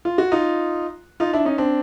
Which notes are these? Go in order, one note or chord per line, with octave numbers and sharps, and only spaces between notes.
F4
F#4
D#4 F4
D#4 F4
D4 E4
C#4 D#4
C4 D4